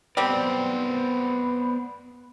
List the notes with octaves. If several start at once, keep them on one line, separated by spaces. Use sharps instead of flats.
G3 B3 C4 B4 C5 D5